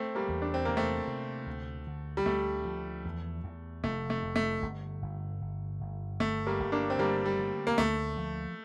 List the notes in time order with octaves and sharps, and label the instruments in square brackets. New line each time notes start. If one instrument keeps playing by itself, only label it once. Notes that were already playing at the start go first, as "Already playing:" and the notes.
Already playing: [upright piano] A3 C4
G3 A#3
[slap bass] E2
[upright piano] D4
C4
[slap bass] C3 [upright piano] A#3
[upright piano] A3 C4
[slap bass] C3
D2
D3
[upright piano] G3
[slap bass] D2 [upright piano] A3
[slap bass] F3
E2
E2
[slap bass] F1 [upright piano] A3
[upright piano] A3
[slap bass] F1
[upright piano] A3
[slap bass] G1
G1
G1
G1
[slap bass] G1 [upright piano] A3
[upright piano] G3 A#3
[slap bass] G1
[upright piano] A#3 D4
C4
[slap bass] D3 [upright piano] G3 A#3
[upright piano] G3
[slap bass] D3
[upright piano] A#3
[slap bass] D2 [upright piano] A3
[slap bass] F3